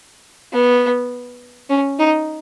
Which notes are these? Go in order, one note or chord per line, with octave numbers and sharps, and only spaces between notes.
B3
C#4
D#4